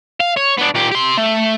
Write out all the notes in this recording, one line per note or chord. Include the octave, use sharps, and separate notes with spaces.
F5
C#5
B3 D4
A#2 G4
G4 C6
A3